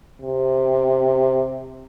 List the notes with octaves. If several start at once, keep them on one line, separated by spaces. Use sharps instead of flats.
C3